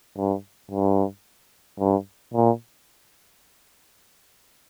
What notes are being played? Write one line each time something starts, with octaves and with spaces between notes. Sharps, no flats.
G2
G2
G2
A#2